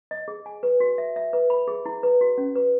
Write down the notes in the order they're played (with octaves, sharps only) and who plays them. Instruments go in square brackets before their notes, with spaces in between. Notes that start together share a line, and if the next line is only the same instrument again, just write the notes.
[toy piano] D#5
G#4
G#5
B4
F#4
E5
E5
B4
B5
G#4
E4
B4
F#4
C#4
B4